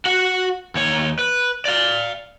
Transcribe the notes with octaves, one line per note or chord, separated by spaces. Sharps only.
F#4 F#5
D#2 C#5
B4
D5 F5